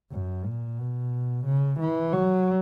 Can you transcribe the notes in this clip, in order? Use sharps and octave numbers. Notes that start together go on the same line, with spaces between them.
F#2
A#2
B2
C#3
E3
F#3